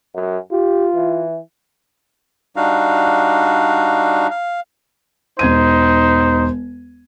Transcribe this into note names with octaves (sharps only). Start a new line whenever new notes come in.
F#2
F4 G4
E3
G3 D4 D#4 F#4 F5
F5
E1 D#4 C5 G#6 D#7